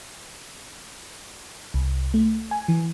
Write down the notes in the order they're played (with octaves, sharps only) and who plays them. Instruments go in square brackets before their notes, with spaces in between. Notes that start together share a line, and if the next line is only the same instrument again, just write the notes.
[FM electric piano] C2
A3
G#5
E3